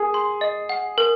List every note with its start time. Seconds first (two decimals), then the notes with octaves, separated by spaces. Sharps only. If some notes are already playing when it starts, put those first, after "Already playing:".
Already playing: G#4 A#4
0.14 C6
0.41 D#5
0.69 F#5
0.98 A#4